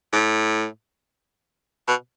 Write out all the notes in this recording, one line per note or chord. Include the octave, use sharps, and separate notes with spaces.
A2
B2